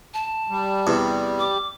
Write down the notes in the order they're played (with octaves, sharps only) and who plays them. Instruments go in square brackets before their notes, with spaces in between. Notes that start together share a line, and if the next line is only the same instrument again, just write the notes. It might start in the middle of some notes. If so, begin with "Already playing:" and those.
[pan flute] A5
[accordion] G3
[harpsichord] E2 C3
[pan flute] D6